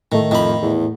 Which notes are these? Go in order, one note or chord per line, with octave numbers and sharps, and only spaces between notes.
A2 D#3 A3
F2 D#3 B5
E2